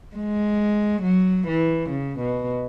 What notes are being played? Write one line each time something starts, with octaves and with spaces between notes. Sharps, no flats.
G#3
F#3
E3
C#3
B2